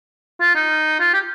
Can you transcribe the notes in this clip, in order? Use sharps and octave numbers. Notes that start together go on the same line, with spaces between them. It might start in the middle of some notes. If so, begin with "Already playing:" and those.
F4
D#4
F4
G4